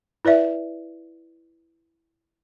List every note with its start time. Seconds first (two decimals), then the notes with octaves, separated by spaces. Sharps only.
0.25 E4 B4 D5 E5